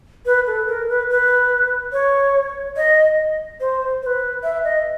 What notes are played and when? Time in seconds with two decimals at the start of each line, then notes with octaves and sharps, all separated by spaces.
0.26 B4
0.47 A4
0.68 A#4
0.89 B4
1.10 B4
1.93 C#5
2.77 D#5
3.60 C5
4.02 C5
4.06 B4
4.43 E5
4.64 D#5